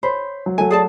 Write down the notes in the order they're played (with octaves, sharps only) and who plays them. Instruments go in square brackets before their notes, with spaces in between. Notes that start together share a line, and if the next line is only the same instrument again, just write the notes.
[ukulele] C5 [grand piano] C#5 B5
[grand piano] F#3
[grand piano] F#3 A3 [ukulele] G#5
[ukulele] G#4 D5 A5